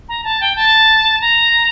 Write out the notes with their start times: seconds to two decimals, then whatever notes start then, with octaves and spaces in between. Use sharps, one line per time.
0.09 A#5
0.24 A5
0.41 G5
0.56 A5
1.21 A#5